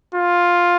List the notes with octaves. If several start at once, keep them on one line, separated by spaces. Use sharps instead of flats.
F4